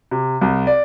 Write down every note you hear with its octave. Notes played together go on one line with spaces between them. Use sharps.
C3
C2
D5